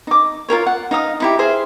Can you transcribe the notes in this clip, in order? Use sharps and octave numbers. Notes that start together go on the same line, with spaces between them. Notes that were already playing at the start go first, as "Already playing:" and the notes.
D#4 D6
F4 G#4 A#4 C#5
F#5
D#4 F5 D#6
D#4 E4 G4
G#4 C5 E5 F5